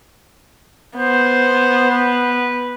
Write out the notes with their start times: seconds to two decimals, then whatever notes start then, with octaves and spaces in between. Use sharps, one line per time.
0.97 B3 C5
1.91 B4